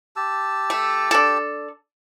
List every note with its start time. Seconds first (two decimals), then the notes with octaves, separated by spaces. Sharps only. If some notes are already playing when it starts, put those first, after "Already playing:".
0.16 G4 A5 E6
0.70 A3
1.11 D4 A4